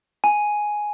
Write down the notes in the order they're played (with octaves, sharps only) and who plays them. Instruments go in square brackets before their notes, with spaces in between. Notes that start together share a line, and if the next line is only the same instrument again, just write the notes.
[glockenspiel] G#5